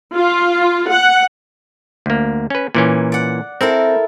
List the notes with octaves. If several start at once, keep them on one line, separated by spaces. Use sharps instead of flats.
F4
F#5
D2 A#3
C#4 B4
A#2 E3 C#4
D5 F#5
C4 E4 A4 A#4